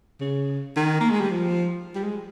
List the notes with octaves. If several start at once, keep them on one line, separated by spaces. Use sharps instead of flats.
C#3
D#3
A#3
G#3
G3
F3
G3
G#3